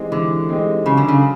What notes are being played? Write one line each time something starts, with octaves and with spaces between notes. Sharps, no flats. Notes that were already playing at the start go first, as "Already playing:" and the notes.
Already playing: E3 G#3 C4 D#4 G4
D3 E3
G#3 C4 D#4 G4
C#3 F#3
D3
C#3